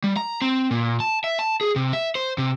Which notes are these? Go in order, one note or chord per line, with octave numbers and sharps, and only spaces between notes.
G3
A#5
C4
A#2
A5
E5
A5
G#4
C3
E5
C5
C3